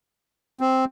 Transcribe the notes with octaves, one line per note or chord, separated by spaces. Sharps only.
C4